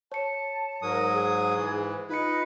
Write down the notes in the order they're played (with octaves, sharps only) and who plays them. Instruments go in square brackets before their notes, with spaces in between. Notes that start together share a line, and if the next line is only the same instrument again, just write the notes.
[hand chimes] C#5 C#7 [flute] A5
[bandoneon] G#2 F#3 D#6 [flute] A#4
[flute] G#4
[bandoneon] G#2 E3
[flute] D#4 [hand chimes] F4 C#7 [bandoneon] B4